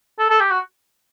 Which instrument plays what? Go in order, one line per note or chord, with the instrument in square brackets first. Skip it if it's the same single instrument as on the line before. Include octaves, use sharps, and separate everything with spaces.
[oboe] A4
A4
G4
F#4